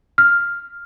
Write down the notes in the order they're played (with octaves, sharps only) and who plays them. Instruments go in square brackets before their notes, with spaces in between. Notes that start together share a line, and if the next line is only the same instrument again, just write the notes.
[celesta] F6